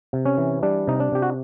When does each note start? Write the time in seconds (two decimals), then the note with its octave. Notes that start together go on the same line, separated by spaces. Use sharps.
0.13 C3
0.26 C#4
0.38 E3
0.63 G3 D4
0.87 C3 D#4
1.00 D4
1.12 C3 G4
1.22 F#4